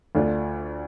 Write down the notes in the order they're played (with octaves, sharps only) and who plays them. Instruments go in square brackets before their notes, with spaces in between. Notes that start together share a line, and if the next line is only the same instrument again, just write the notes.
[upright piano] D2 D3 A3 D4 F4